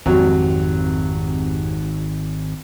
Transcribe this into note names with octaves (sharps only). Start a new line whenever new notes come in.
G#1 F2 F#3 C4 G4